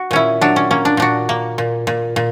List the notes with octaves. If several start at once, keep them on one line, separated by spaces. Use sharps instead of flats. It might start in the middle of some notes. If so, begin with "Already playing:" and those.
Already playing: F#4
A#2 C#4 E4
F#3 D4
C#4
A#3 C#4
D4
A#2 D4 F#4
A#3
A#2
A#2
A#2